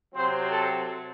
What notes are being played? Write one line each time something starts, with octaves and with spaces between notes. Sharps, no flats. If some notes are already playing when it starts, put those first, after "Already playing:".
C3 F#3 C4 C5
A4